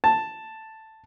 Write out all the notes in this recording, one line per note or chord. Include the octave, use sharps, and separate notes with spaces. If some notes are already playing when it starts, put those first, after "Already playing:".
A5